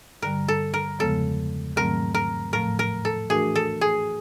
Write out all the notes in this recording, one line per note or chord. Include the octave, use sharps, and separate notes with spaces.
G2 D3 G3 A#4
A4
A#4
E2 C#3 F3 G#3 B3 A4
G#2 D#3 F#3 A3 C4 A#4
A#4
A2 F3 A3 A#4
A#4
A4
E3 A3 D4 F#4 G#4 A#4
A4
G#4